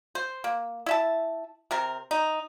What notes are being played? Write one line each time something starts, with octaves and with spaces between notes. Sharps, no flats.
C5
A#3
E4 E5 A5
C3 C4 A#4
D#4